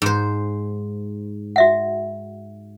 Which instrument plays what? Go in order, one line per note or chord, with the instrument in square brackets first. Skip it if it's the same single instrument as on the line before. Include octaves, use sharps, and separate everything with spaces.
[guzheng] G#2 C5
[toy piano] F#4 E5 F#5